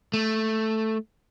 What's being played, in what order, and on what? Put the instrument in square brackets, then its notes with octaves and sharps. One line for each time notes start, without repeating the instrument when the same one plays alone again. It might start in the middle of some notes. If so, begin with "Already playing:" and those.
[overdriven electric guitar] A3